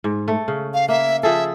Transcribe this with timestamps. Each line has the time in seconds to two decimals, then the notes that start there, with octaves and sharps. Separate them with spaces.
0.04 G#2
0.28 A3
0.48 C#3
0.74 F5
0.88 A#3 E5
1.23 F3 G#4 A4 E5